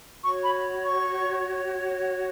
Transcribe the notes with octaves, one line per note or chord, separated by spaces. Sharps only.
F#4 C#5 C#6
B5
C#6